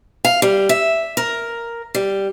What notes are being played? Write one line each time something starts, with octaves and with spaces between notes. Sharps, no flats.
F5
G3
E5
A#4
G3